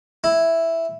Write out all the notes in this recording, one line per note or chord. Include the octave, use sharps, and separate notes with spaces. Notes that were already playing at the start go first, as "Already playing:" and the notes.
E4